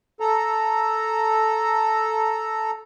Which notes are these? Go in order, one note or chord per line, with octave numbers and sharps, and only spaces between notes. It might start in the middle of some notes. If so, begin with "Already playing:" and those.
A4 A#5